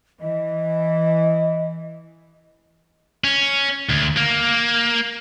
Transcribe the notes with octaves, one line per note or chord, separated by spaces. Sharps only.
E3 D#5
C#4
D2
A#3